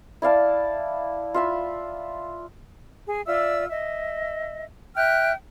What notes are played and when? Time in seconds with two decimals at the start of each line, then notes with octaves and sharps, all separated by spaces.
0.22 E4 D5 F5 A5
1.34 F4 E5 B5
3.05 G#4
3.26 F4 D5 E5 E6
3.69 D#5 E5
4.96 E5 G5 F6 F#6